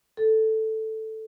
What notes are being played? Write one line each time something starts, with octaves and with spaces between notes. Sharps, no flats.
A4